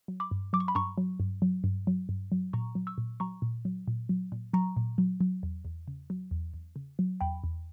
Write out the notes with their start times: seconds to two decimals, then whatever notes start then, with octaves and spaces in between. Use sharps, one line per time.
0.08 F#3
0.20 B5 D6
0.31 G2
0.53 F#3 D6
0.60 C#6
0.68 B5
0.75 G2 A#5 C#6
0.98 F#3
1.20 G2
1.42 F#3
1.64 G2
1.87 F#3
2.09 G2
2.32 F#3
2.53 A#2 A#5 C#6
2.75 F#3
2.87 C#6 E6
2.98 A#2
3.20 F#3 A#5 C#6
3.42 A#2
3.65 F#3
3.88 A#2
4.09 F#3
4.32 A#2
4.53 F#3 A#5 C#6
4.77 A#2
4.98 F#3
5.20 F#3
5.43 E2
5.65 E2
5.87 C#3
6.10 F#3
6.31 E2
6.54 E2
6.76 C#3
6.99 F#3
7.21 E2 G5 B5
7.44 E2